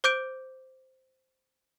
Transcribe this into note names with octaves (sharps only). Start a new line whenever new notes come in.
C5 D6 G6 D7